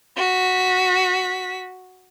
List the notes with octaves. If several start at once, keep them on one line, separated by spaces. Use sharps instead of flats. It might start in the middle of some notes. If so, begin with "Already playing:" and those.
F#4 B6